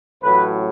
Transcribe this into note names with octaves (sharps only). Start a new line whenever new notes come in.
A1 A2 F#3 B4